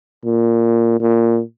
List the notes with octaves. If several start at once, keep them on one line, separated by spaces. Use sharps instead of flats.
A#2
A#2